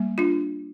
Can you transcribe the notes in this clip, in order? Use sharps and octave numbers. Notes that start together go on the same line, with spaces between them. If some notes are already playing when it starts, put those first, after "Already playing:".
Already playing: G3 A#3
D4 F4